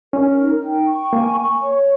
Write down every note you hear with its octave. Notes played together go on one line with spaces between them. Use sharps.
C#4 A#4
D#4
G5
C#6
A#3 G#5
C#6
C#5